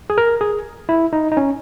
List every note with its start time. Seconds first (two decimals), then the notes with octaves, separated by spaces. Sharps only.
0.10 G#4
0.18 A#4
0.41 G#4
0.89 E4
1.13 D#4
1.32 D#4
1.37 C#4